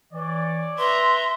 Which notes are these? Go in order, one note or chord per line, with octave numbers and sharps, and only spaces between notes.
E3 C#5 D5
B4 E5 A#5 C6